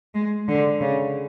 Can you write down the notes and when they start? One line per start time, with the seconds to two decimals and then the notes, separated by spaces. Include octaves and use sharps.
0.14 G#3
0.48 D3
0.81 C#3